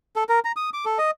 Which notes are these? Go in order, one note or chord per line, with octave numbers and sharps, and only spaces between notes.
A4
A#4
A#5
D#6
D6
A4
D#5